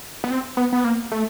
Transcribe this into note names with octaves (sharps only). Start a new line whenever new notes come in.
B3
C4
B3
B3
A#3
A3